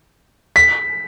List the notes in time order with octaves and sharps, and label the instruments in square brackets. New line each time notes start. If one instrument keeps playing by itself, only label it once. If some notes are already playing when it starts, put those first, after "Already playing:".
[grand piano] B6